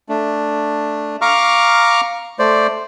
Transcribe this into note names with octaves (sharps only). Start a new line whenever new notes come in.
A3 D4
F5 A#5 C#6 D6 F6
A3 C5 D5